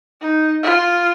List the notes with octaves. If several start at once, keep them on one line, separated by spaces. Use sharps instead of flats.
D#4
F4